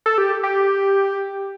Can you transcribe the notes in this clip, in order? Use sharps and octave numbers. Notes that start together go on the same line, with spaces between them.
A4
G4
G4